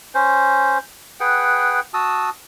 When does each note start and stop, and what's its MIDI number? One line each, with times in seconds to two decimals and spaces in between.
0.15 0.78 61
0.15 0.78 72
1.20 1.80 68
1.20 1.80 71
1.20 1.80 78
1.20 1.80 79
1.94 2.30 66
1.94 2.30 81
1.94 2.30 87
1.94 2.30 88